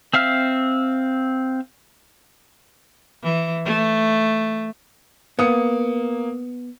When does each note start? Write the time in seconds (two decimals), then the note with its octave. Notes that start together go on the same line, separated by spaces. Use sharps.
0.14 C4 E5 F5 F6
3.23 E3
3.65 A3
5.39 A#3 B3 D#6 C#7